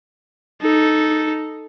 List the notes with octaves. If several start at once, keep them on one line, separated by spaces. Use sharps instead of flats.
D#4 A4